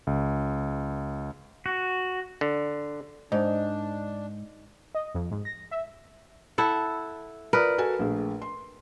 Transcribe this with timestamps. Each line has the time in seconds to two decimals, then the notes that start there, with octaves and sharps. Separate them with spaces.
0.07 C#2
1.66 F#4
2.41 D3
3.32 G#2 D4 D#4 C5 D#5
4.95 D#5
5.15 F2
5.31 G#2
5.45 A#6
5.71 E5
6.58 E4 A4 F#5
7.53 F4 A#4 B4 D5 D#6
7.78 F#4 A4 G#5
7.99 A#1 A3 G#4
8.42 C6